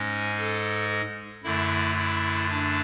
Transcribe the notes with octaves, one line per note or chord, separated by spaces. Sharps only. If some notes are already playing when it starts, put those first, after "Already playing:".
Already playing: G#2 G#3 C#4
A4
F#2 D3 A3 E4
E4
D4